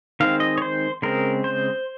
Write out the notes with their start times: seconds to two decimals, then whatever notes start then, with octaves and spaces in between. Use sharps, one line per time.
0.20 D#3 G#3 C4 F5
0.40 D#5
0.58 C#5
0.62 C5
1.02 C#3 G#3 C4 A#4
1.44 C5